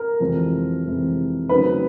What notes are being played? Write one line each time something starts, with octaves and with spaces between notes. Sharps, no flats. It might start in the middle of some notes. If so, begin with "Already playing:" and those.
Already playing: A#4
F2 C3 E3 G#3 C4
F2 C3 E3 G#3 C4
C#3 F#3 A3 C4 D#4 B4